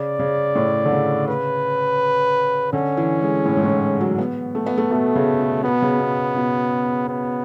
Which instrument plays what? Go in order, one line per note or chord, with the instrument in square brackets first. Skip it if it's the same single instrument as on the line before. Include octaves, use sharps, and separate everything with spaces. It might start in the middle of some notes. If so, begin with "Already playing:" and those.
Already playing: [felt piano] C#3 [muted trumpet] D5
[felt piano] C#3
A2
D3
C#3
[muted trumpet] B4
[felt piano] D3 [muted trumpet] C#4
[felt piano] E3
G#3
A2
G#2
A2
F#3
B3
A3
B3
A3
[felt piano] B2 [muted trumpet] A3
[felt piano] C#3
B2
[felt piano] B2 [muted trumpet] B3
[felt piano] C#3
B2
B2
[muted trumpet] B3